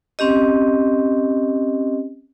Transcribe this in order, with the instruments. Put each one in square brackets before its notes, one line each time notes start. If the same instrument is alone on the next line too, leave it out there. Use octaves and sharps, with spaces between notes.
[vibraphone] C4 C#4 G4 D#5